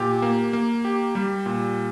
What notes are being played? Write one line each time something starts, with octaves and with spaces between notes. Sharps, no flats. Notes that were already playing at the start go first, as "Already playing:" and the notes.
Already playing: A#2 G4
A#3
A#3
G4
G3
A#2